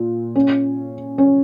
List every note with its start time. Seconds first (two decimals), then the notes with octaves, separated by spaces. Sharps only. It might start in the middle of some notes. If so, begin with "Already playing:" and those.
Already playing: A#2
0.36 C#4
1.18 C#4